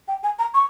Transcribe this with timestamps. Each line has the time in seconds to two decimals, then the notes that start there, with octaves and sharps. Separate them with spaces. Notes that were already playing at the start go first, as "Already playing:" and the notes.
0.08 G5
0.23 G#5
0.39 A#5
0.54 C#6